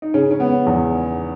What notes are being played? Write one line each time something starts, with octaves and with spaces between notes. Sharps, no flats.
D#4
C#3 C#4
C#4
B3
E2